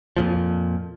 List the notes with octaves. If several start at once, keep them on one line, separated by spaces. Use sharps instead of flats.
F2 A#2 F3